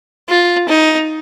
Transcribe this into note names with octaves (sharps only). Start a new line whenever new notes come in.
F4
D#4